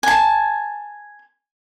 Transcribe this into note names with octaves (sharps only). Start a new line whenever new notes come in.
G#5 A5